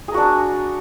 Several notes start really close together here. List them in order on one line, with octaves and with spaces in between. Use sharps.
G#4 A#4 F#4 D4